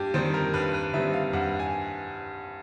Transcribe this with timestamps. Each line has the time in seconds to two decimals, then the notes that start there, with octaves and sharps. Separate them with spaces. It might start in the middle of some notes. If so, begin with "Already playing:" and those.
Already playing: G2 G4
0.14 D#3 G3 C4 C5
0.34 A#4
0.54 G2 B4
0.74 B4
0.94 D#3 G3 C4 E5
1.14 F5
1.33 G2 F#5
1.59 G#5